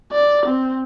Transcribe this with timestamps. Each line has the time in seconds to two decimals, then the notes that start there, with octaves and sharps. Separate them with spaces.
0.11 D5
0.46 C4